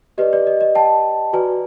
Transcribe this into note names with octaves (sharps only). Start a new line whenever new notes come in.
G4 B4 D5 D#5
D5
D#5
D#5
G5 A5
F#4 B4 D5 G#5 A#5